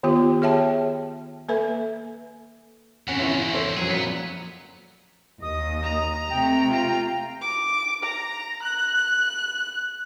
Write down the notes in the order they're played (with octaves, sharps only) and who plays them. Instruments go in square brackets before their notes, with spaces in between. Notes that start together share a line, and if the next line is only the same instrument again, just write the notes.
[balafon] D#3 B3 F4 G4
G#4 C#5 E5 G5 A5
A#3 A4 B4 E5
[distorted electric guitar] E2 D3 [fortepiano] C#4 F#5
[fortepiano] A1 C#4 E4
A4 C5 C#5
[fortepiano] F#2 F#3 [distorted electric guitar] G#4
[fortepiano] F#2 A#2 [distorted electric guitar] B3 B4
[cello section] D#2 D#5 [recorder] D#6
[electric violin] A#5
[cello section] C3 A3 [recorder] G5
[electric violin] F4 A#5
[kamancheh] D6
A#5
F#6